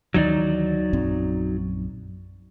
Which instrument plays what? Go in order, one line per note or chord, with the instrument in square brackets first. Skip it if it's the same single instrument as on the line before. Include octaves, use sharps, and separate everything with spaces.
[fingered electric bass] D2 D#3 E3 [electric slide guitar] F#3 D#4 D5
[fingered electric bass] A#1 F#2 C4